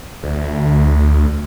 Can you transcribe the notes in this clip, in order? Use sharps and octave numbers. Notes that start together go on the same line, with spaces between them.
D2